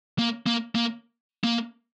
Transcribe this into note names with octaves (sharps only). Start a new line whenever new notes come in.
A#3
A#3
A#3
A#3